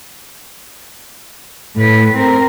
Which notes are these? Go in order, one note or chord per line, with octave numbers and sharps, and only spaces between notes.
A2 B4
C4 A#4